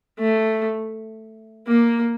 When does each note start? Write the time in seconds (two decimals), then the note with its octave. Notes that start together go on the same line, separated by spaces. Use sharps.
0.20 A3
1.68 A#3